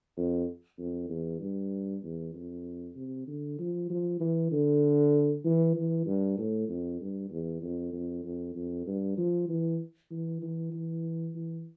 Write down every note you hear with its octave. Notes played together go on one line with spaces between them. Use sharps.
F2
F2
E2
G2
E2
F2
C3
D3
F3
F3
E3
D3
E3
E3
G2
A2
F2
G2
E2
F2
F2
F2
F2
G2
F3
E3
E3
E3
E3
E3